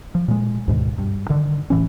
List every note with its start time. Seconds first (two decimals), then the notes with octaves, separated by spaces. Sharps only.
0.15 F3
0.28 A#2 G#3
0.68 D2 G#2 B2 D#3
0.99 G2
1.30 D3 D#3
1.70 D1 A2 E3 C#4